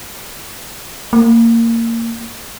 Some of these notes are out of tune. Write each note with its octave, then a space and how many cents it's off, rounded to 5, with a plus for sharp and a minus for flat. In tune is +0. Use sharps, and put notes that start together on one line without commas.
A#3 -20